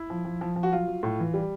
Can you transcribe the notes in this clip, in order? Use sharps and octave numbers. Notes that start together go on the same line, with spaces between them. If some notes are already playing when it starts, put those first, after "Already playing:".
Already playing: E4
F3
F3
F3
F3
F#4
F#3 F4
F#3
A2
E3
G3